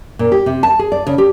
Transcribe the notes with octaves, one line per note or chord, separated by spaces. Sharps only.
A#2
G4
C3
A5
G#4
D5
C#3
G4